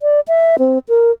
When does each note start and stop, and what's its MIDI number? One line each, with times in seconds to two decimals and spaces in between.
0.01 0.20 74
0.28 0.56 76
0.59 0.79 60
0.89 1.11 70